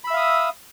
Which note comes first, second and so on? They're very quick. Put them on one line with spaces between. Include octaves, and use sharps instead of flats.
B5 E6 E5 F5 D#6